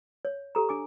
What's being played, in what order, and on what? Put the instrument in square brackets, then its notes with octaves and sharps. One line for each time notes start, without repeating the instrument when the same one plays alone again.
[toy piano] C#5
G4 A4 A#5
D4 G#5 D6